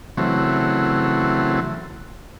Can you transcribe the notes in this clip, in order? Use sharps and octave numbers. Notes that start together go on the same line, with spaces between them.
C#3 E3 F#3 A3 C4